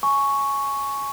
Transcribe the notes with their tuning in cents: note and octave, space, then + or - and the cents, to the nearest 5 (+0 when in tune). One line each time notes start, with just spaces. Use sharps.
G#5 +15 C#6 +0